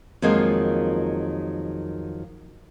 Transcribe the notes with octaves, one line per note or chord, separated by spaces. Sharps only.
F2 D#3 F#3 G#3 A#3 F4